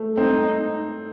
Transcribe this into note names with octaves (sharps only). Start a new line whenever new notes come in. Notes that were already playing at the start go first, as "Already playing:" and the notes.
Already playing: A3
C4 D#4